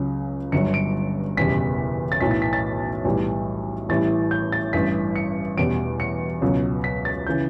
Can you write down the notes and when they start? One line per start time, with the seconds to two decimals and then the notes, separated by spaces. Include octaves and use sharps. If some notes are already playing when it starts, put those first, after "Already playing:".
Already playing: C#2 C#3 F#3
0.52 G1 G2 F#3 C#7
0.74 D7
1.37 F#1 E2 B2 G3 B6
2.12 A6
2.21 B1 A2 E3 B6
2.31 A6
2.42 B6
2.53 A6
3.05 B1 A2 E3 G3
3.89 A1 A2 E3 G3 A6
4.31 G6
4.52 A6
4.73 A1 G2 E3 B6
5.16 C#7
5.57 E2 B2 G3 D7
6.00 C#7
6.42 C#2 B2 F#3
6.84 B6
7.05 A6
7.27 C#3 E3 G6